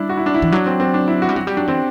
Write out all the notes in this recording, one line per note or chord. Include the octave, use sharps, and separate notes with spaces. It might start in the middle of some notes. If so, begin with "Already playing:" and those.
Already playing: G3 D4 E4
F#4
E4
D4
E4
E3
F#3 D4
C4
C4
D4
E4
F#4
G3
F#3 F#4
G3 G4
F#3 D4
E3 C4